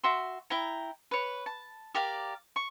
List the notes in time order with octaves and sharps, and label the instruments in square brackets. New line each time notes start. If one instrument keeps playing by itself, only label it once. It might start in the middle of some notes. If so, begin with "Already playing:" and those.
[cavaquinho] F#4 E5 C6
E4 G5 A#5
B4 C#5
A5
G4 A#4 D5 F5
C#6